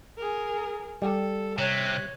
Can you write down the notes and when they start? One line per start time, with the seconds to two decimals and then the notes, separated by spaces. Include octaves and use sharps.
0.18 G#4 A#4
1.02 G3 A4
1.58 C3 C#5 F#6